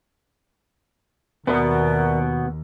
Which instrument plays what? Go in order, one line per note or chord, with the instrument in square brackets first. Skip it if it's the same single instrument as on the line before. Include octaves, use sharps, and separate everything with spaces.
[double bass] D#2 [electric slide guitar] B2 B3 [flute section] A#4 D5 E5